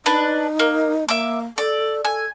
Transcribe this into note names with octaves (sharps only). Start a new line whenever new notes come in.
D4 D#4 B4
A#3
A#3 E5 D6
A4 D5
A4 G#5